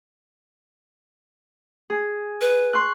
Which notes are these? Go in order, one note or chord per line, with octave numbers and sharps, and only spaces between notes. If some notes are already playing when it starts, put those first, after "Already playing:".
G#4
B4
C6 C#6 F#6